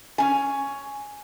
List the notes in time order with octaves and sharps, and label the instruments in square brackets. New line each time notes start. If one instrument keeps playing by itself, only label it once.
[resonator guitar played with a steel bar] C#4 G#5